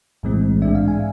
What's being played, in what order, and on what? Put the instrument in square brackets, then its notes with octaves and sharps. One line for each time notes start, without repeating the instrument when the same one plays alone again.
[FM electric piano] B1 A2 E3 G#3 C4
G#2 G#3 D4 E5
F5
G#5